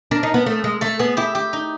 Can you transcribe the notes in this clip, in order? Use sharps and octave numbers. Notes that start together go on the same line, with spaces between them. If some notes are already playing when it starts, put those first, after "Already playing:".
D4 A#4
D#4
B3
A3
G#3
A3 A4
B3 G#4
E4 G4
G4
D#4